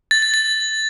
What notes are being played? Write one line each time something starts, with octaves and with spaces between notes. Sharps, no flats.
A6
A6
A6